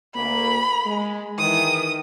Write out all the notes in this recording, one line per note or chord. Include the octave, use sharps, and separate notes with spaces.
D2 A#3 B5
G#3
D#3 E3 D#6